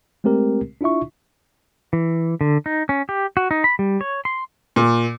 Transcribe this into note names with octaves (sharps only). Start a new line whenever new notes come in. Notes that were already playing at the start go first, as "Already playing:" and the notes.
G#3 A3 C4 G4 A#4
D4 E4 F4 E5 C#6
E3
D3
D#4
C#4
G4
F#4
D#4
B5
G3
C#5
C6
A#2